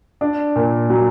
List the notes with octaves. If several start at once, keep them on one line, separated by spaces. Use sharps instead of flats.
D4
A#2
F#3